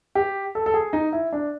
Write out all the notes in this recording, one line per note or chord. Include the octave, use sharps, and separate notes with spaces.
G4
A4
A4
G#4
D#4
E4
D4